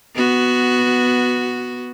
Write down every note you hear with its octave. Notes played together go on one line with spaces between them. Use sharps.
B3 F#4